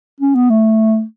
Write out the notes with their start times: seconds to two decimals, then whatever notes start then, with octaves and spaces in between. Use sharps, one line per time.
0.21 C#4
0.35 B3
0.50 A3